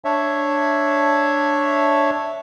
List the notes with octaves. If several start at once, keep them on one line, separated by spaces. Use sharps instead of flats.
D4 C#5 E5